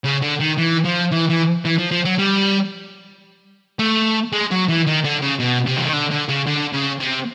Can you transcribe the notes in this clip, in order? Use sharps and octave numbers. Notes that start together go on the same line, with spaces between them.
C#3
D3
D#3
E3
F3
E3
E3
E3
F3
F3
F#3
G3
A3
G#3
F#3
E3
D#3
D3
C#3
B2
C3
E3
D#3
D3
D3
C#3
D3
C#3
C3